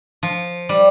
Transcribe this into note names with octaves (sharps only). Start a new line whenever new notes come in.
F3
G3